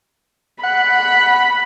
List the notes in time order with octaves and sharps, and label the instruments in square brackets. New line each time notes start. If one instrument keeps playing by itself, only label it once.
[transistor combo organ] F#5 [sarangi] B5